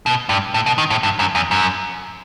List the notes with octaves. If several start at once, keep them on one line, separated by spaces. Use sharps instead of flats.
B2
G2
A2
B2
D#3
A2
G2
F#2
E2
F#2